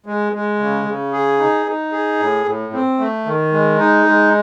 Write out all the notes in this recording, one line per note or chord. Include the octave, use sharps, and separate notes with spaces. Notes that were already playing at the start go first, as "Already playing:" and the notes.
G#3
G#3
C#3
C#3
G#4
D#4
D#4
G#4
A2
A2
C4
A3
D#3
G#3
D#4
G#3